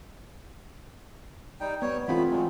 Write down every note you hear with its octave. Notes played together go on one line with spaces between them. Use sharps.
G3 D#4 G5
G3 B3 C#5
E3 A3 B3 C4 F4 B5
F#3 G#3